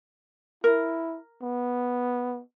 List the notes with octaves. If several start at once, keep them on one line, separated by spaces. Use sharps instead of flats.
E4 A#4
B3